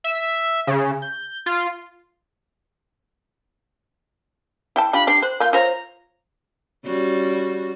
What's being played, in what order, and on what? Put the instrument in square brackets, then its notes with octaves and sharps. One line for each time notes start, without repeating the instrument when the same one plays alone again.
[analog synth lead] E5
C#3
G6
F4
[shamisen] E4 G5 A5
[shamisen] D4 F4 G4 [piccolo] B5
[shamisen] D4 G4 [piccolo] C7
[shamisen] C5 [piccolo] F#6
[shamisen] A#3 F4 [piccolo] G6
[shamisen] F4 C5 C#5 [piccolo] A#5
[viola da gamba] G3 C#4 F#4